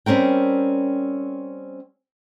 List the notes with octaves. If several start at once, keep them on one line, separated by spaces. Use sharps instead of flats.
G3 C4 C#4 A#4 G5